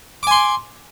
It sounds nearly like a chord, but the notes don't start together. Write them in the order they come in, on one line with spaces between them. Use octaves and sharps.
D6 G#5 C6